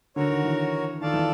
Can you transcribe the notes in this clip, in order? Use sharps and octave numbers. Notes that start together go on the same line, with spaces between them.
D3 F#4 A#4 C#5
D#3
E3
D#3 F4 A4 D5 F5 A5
E3